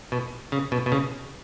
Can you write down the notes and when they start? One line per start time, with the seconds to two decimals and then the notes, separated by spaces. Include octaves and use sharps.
0.12 B2
0.52 C#3
0.72 B2
0.86 B2
0.92 C#3